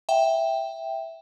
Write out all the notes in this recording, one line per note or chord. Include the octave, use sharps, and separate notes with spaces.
E5 G5